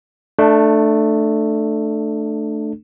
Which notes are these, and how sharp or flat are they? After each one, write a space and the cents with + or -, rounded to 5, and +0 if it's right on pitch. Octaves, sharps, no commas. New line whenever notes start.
A3 +0 D4 +20 A4 +0